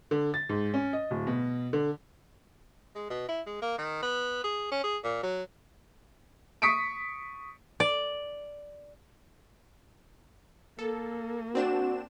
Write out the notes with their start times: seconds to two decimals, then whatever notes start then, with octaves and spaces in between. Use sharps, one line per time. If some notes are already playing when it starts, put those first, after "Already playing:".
0.11 D3
0.34 A6
0.49 G#2
0.74 C#4
0.93 D#5
1.11 D1
1.27 B2
1.73 D3
2.95 G#3
3.10 B2
3.29 E4
3.46 G#3
3.62 A#3
3.78 D#3
4.03 B3
4.44 G#4
4.71 C#4
4.84 G#4
5.04 A#2
5.23 F#3
6.62 C#6 D#6 B6 C#7 D7
7.80 D5
10.79 A#3 A4
11.55 C4 D4 F#4 E7